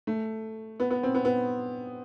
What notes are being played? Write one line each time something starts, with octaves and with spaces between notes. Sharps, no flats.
A3
B3
B3
C4
B3
B3